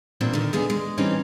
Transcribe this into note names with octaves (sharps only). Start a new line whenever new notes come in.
E2 A#2 G3 C4 D4
D3 D#3
D#2 D3 B3 G#4
G#3
E3 G3 C4 C#4 D#4